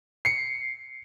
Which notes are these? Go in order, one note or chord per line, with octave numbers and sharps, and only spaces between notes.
C7 C#7